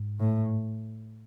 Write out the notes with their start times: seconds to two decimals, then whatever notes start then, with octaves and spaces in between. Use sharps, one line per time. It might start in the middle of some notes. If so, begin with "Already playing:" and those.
Already playing: G#2
0.19 A2